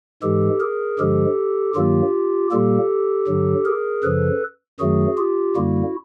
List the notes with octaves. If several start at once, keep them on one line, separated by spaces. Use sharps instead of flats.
G#2 E3 G#3 G4 A4
G#4 A#4
G2 D3 F3 G#3 G4 A4
G2 D#3 F#3 A#3 F4 G4
A#2 G3 A#3 G4 A4
G2 D3 F#3
G#4 A#4
F#2 C#3 F3 A4 B4
F#2 D#3 F#3 A3 F#4 G#4
F4 G4
F#2 D3 G3 A#3 E4 F#4